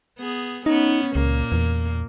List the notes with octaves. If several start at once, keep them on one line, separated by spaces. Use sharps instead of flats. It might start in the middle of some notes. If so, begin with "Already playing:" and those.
B3 G#4
B3 C#4 D#4
C#2 A#2 A#3
E2